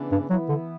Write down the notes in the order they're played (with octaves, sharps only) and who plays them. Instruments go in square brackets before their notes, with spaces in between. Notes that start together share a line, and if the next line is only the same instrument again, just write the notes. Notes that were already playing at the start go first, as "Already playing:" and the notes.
Already playing: [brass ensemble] C#3 E3 B3 D4
[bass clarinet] G2
[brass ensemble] E3 B3 E4 [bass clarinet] F#3
[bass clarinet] D3